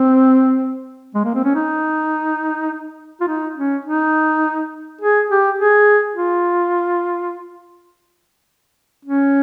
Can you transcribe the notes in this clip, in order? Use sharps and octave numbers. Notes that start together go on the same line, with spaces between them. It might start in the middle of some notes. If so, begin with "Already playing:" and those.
Already playing: C4
G#3
A#3
C4
C#4
D#4
F4
D#4
C#4
D#4
G#4
G4
G#4
F4
C#4